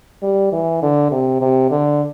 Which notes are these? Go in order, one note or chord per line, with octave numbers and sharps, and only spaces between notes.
G3
E3
D3
C3
C3
D3